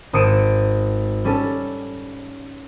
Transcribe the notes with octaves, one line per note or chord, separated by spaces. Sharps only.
G#1 D#6 C#7 D7 E7
G3 C#4 A4